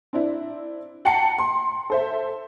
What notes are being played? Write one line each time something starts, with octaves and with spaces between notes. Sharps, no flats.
C4 D4 E4
F#5 G5 A5 A#5 C7 C#7
C6
A4 C5 E5